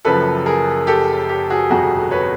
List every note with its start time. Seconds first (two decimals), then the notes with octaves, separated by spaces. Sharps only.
0.05 F#1 F#2 C#3 F3 A4 B4
0.46 G#4 A#4
0.87 G4 A4
1.29 G4
1.50 F#4 G#4
1.70 G1 F2 C3 F#4 G#4
2.11 B4 C#5